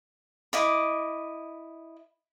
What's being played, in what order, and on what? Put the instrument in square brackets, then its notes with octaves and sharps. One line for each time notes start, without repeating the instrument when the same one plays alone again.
[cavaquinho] E4 D#5 D6